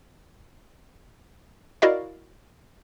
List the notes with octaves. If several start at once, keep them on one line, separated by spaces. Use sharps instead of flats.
E4 F#4 A#4 D5 D#5 F5